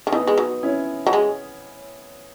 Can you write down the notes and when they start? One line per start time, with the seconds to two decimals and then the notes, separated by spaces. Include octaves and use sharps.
0.07 D#3
0.12 E3 B3 D#4
0.27 G#3
0.38 F#3
0.63 C#4 E4
1.07 F#3
1.13 G#3